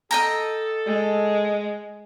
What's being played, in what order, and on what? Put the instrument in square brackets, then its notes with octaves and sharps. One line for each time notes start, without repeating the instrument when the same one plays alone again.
[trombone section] A4 [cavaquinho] D#5 G5 A#5
[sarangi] G#3